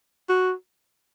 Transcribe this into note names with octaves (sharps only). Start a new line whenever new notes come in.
F#4